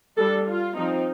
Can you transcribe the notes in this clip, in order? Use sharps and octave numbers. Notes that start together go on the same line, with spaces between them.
G3 D4 A4
F4
F3 C4 D#4